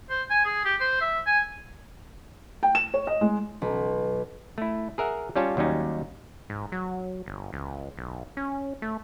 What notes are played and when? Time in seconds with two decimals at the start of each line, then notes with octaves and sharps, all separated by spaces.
0.10 C5
0.30 G#5
0.45 G#4
0.65 G4
0.80 C5
1.01 E5
1.26 G#5
2.63 G5
2.75 E7
2.94 C#5
3.07 D#5
3.21 G#3
3.62 B1
4.58 A3 E4
4.98 G#4 A#4 E5 F#5
5.36 G3 C#4 F4 C#5 A5
5.57 D#2 F#3 G3 C#4 D#4
6.50 G#2
6.72 F#3
7.26 G1
7.53 C#2
7.97 B1
8.37 C#4
8.82 A3